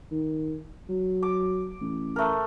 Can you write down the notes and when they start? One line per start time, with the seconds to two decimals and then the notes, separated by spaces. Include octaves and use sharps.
0.11 D#3
0.89 F#3
1.23 D6
1.81 A1
2.16 A3 A#4